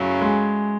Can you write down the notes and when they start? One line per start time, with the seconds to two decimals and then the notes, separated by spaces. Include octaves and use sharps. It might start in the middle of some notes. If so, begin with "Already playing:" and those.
Already playing: F#2 C#3 F#3 A3 E4
0.21 G#3